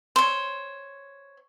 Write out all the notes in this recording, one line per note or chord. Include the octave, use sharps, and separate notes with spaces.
C5 C#5